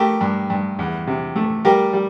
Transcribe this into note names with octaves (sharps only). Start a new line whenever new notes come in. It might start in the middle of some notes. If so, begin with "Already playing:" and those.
Already playing: A3 G4 A#4
G2
G2
E2
C3
A3
G3 G4 A#4
G3